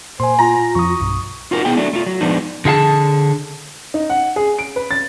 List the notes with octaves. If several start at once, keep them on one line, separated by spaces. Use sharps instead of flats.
A#2 C5 G#5 C6
F4 A#5
F2 F3 C#6 D#6
B1 G2
D#4 F4 F#4 A#4
B3 E4 G#4 G5
F#3 A3 D4
A3 F4
F#3
F3 G#3 B3 D4 D#4
D3 G#4 F5 A5
D#4
F#5
G#4
D7
B4
A6